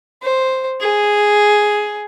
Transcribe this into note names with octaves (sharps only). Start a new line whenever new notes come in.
C5
G#4